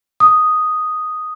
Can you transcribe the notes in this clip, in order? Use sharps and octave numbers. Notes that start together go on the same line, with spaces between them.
D#6